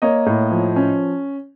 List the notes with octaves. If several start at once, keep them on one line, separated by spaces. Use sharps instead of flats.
A#3 C#5 D#5
A2
F3
C#4